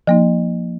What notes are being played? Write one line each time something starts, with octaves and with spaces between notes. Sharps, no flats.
F3 A#3 D#4